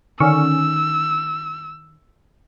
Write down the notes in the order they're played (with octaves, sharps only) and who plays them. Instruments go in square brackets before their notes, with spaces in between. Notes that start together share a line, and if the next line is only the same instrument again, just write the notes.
[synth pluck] D3 C#4 [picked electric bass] D#3 [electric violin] E6